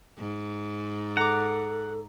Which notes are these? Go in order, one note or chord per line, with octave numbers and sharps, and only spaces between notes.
G#2
A4 F#5 A#5 D6